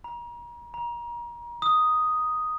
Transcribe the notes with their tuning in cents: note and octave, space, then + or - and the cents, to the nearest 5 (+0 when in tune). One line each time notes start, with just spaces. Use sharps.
A#5 +35
A#5 +30
D#6 +0